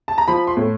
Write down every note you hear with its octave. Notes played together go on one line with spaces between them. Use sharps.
A5
A#5
F3 B5
C6
A2